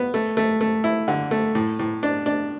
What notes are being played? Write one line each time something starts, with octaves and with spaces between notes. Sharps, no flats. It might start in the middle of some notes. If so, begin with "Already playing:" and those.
Already playing: B3
A3
A3
A3
E4
D3
A3
A2
A2
D4
D4